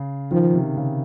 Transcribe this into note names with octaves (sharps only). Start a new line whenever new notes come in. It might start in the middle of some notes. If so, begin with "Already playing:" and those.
Already playing: C#3
D#3 F3
C3
C#3